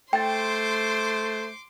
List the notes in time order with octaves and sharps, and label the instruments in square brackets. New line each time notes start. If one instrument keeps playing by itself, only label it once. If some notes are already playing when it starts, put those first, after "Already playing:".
[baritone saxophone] A3 [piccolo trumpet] C5 [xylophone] G5 A6 [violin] C6 D6